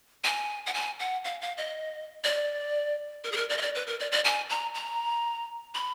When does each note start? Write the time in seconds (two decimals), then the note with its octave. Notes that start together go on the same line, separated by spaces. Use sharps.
0.24 G#5
0.66 F#5
0.74 G#5
1.00 F#5
1.24 F5
1.41 F5
1.57 D#5
2.24 D5
3.24 A#4
3.32 G#4
3.37 A#4
3.50 D5
3.58 D#5
3.62 D5
3.75 B4
3.87 A#4
4.00 D5
4.12 D5
4.25 G#5
4.50 A#5
4.75 A#5
5.75 B5